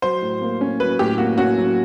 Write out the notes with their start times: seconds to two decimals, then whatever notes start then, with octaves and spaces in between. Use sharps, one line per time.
0.02 F#3 C5
0.22 A2
0.41 A#3
0.61 C#4
0.80 F#3 B4
0.99 A2 G4
1.18 A#3 F#4
1.38 C#4 F#4
1.57 F#3